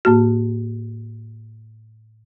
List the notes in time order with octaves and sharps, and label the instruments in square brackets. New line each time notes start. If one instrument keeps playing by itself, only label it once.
[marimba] A2 A#3 F#4